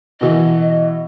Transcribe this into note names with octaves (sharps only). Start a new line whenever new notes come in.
B2 E3 D#5